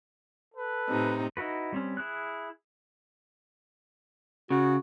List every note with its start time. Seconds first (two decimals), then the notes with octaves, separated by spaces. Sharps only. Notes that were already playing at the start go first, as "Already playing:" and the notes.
0.54 A4 B4
0.89 A2 C3 D#4
1.37 D#4 E4 F#4 B4
1.72 G3 C4 C#4
1.97 E4 G#4 F#6
4.50 C#3 F#4